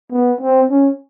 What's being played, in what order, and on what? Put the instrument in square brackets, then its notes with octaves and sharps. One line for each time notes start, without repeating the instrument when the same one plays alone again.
[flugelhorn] B3
C4
C#4